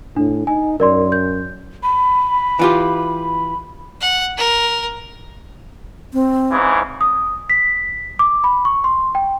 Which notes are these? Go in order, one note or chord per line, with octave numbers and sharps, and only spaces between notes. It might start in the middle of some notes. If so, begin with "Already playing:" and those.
A2 D4
D#4 G#5
F#2 A#4 D5 C6
G6
B5
E3 F4 G4
F#5
A#4
C4
G#2 C#3 E3
D#6
B6
D6
B5
C#6
C6
G5